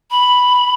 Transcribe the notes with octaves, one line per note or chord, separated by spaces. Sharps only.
B5